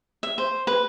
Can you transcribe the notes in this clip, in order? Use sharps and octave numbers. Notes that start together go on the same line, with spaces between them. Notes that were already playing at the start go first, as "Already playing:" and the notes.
E5
C5
B4